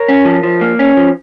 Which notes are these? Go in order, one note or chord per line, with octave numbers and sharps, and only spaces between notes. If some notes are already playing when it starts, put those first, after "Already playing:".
Already playing: A#4 C#5
C#4
F3
F3
A#3
C#4
F3